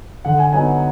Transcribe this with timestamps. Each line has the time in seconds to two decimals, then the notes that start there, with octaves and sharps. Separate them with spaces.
0.25 D3 F#5
0.39 G#5
0.53 F#3 B3 D#4 G#5